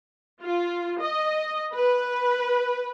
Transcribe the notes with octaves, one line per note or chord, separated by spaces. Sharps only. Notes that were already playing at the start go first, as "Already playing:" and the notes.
F4
D#5
B4